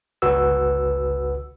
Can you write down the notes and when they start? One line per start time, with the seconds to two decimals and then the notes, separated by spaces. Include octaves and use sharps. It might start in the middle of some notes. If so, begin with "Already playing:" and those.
0.22 G1 C#2 F#4 B4 F#5 E6